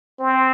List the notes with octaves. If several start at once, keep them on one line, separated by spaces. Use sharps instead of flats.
C4